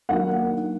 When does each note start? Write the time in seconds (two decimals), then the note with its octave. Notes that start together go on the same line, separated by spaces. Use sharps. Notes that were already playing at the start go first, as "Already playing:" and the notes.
0.09 D#3 F#3 A#3 D4 F#5